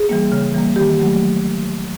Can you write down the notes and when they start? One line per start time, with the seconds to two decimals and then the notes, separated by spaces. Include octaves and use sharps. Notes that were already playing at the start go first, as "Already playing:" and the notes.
Already playing: G#4
0.09 E3 G3 A#3
0.32 C#3
0.54 E3 G3 A#3
0.76 D#3 G4
0.99 F#3 A3